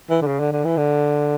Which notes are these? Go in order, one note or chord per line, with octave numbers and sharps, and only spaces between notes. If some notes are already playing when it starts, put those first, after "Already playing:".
E3
D3
C#3
D3
D3
E3
D3